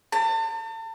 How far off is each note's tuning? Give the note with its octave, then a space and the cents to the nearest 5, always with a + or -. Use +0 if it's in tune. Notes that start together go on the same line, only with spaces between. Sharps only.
A5 +40